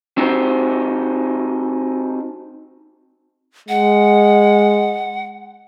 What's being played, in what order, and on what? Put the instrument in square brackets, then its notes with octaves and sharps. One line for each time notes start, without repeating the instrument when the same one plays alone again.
[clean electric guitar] C4 D#4 F#4 G4 C5
[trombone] G#3 [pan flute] F#5